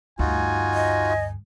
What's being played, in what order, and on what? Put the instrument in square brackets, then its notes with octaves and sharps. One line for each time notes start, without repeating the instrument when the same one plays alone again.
[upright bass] D2 G2 [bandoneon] D#4 F4 F#4 [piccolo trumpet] G#5
[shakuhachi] D#5